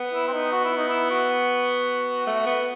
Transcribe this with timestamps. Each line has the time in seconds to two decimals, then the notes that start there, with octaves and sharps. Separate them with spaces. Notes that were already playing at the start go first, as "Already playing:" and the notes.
Already playing: B3
0.13 E4
0.28 C4
0.33 D#4
0.52 F#4
0.64 E4
0.77 D#4
0.89 E4
1.10 F#4
2.27 A3
2.46 B3